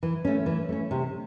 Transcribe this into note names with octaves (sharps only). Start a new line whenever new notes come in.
E3
A3 C#4
E3
A3 C#4
C3